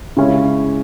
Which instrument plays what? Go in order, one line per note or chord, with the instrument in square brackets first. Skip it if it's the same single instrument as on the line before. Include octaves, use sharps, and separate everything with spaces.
[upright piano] C#3 G#3 C#4 E4